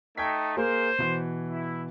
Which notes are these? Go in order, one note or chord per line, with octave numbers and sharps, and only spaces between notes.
A3 D#4 G5 G#6 B6
A#3 G#4 A#4 C5
B2 E3
E4